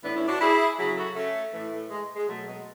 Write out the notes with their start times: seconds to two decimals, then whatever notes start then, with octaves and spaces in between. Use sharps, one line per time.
0.03 A2 E3 B3 D4
0.15 C#4 E4
0.28 D4 F#4
0.41 E4 G#4
0.78 C#3 F#3 E4 G#4
0.97 F#4 A4
1.16 A3 C#4
1.53 A2 E3 A3
1.73 A3
1.91 G#3
2.16 G#3
2.28 B2 F#3 A3
2.47 G#3 B3